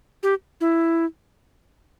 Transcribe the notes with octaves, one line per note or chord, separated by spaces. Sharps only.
G4
E4